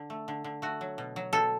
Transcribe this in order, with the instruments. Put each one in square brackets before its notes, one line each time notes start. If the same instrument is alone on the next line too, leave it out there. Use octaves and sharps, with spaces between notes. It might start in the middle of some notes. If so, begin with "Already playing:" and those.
Already playing: [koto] D3
A3
D3
D3
A3 F#4
F#3
B2
F#3
B2 A4